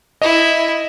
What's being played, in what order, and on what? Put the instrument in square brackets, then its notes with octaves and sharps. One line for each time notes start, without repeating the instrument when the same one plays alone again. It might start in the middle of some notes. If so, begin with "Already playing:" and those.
[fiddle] E4 E5 [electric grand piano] D#5